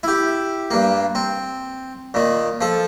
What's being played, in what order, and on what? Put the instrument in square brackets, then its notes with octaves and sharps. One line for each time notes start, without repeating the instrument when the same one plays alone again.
[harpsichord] E4 G4
G2 A#3
C4
A#2 D#3
F3 A4